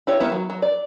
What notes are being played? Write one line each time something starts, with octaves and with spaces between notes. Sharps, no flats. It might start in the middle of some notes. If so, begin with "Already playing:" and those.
E4 G4 C#5
D#3 B3 E4
F#3
F#3
D5